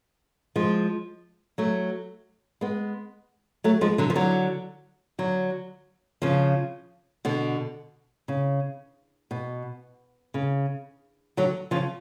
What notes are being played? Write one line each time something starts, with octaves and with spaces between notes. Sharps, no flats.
F3 G#3
F#3 A3
G#3 B3
F#3 A3
F3 G#3
D3 F#3
F3
D3 F#3
D3 F#3
C#3 F3
B2 D3
C#3
B2
C#3
D3 F#3
C#3 F3